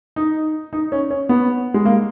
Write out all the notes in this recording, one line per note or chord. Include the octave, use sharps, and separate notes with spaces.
D#4
D#4
C#4
C#4
B3
G#3
A#3